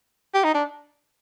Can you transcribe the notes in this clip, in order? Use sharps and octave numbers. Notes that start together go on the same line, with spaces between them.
G4
D#4
D4